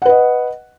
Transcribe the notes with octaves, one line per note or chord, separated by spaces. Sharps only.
B4 D#5 F#5